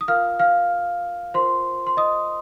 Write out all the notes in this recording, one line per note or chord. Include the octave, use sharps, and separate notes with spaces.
D#6
F4 A#4 F5 F6
F5 F6
F4 A#4 C5 C6
C6
D#5 D#6